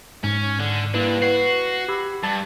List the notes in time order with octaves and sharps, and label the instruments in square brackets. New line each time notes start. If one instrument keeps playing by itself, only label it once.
[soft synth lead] G#2 [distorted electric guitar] C#4
[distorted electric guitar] D3
[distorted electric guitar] G3 D4 [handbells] A#3 E4 B4
[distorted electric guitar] F#4 [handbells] B4 [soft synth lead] C7
[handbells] G4 B5 E6
[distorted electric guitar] G2 [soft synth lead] A5